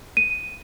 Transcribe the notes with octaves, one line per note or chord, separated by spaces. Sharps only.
D#7